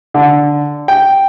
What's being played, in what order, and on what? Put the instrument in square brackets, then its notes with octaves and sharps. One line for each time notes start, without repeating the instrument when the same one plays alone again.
[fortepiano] D3
G5